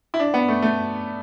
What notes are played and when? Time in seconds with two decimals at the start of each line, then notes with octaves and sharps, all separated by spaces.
0.14 E4
0.20 D4
0.34 B3
0.48 A3
0.62 A3